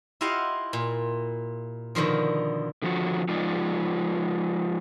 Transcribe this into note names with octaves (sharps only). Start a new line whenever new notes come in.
E4 F4 G4 D#5 F5 F#5
A#2
B2 D3 D#3 F3
D3 F3 F#4
F3 G#3 D#4 F4 D5